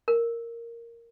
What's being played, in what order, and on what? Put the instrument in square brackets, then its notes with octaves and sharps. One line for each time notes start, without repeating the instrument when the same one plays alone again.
[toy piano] A#4